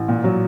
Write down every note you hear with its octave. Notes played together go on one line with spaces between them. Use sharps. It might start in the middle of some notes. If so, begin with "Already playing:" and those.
Already playing: A1
A#2
F#3